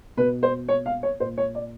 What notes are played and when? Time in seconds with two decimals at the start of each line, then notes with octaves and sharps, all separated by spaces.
0.17 B2 B4
0.43 C5
0.68 C#5
0.86 F5
1.03 C#5
1.20 A#2 C5
1.38 C#5
1.55 D5